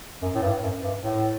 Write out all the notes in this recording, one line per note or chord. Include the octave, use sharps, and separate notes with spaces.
F#2
A2
G2
F#2
G2
A2